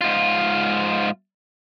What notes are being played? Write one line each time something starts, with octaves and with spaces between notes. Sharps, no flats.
G#2 F4